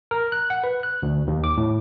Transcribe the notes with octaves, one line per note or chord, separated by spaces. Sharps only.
A#4
F#6
F#5
B4
F#6
D2
D#2
D6
A2